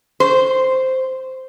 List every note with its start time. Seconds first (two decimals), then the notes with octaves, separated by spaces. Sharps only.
0.20 C5